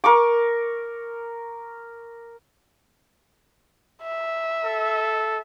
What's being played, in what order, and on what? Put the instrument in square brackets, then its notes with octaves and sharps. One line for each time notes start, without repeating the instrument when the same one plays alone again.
[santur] A#4 C#6 D6
[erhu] E5
[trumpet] A4